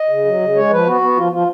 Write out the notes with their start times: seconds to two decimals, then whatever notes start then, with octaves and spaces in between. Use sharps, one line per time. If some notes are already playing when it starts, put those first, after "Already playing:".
Already playing: D#5
0.09 C#3
0.25 F#3
0.41 C#3
0.55 G#3 C#5
0.71 F3 B4
0.86 B3 F#4
1.01 B3
1.17 F3 F4
1.32 F3 F4